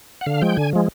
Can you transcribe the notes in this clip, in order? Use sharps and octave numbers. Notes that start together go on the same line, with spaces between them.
F#5
D3 F5
F3 G#3 G5
D3 G#5
F3 G#3